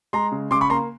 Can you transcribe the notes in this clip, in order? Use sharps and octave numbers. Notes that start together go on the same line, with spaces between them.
G#3 A#5 C6
C#3
C#3 C6 D6
B5 C#6
A#3 A#5 C6